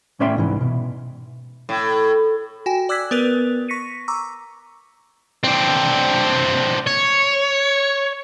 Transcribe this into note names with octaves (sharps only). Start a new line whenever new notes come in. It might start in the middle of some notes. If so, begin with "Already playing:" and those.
A2 C#4 D5 E5 G5 C6
C2 G#2 E3
B2
A2
F#4 G5 G#5
D5 D6 E6 F#6 G#6 B6
B3 A#4 B4 F#6 F7
C#6 A#6 B6 C#7 D#7
A#5 C#6 D6 E6
C4 D4
C#5